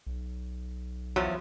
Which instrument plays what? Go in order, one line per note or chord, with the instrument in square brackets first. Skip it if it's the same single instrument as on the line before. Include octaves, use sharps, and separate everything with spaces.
[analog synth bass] B1
[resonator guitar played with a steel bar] E2 F3 [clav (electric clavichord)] F#3